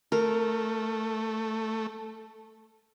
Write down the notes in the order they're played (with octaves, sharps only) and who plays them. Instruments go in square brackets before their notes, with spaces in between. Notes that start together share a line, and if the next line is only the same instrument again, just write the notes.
[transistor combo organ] A3 [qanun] A#4